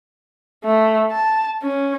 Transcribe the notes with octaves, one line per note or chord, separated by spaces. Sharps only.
A3
A5
C#4